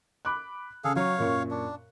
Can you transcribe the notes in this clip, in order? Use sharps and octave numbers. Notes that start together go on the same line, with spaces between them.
B5 D6 F#6
C#3 G#4 A4 F5
F#3 C#5 F5 C#6
F#2 A#2 C#6
D4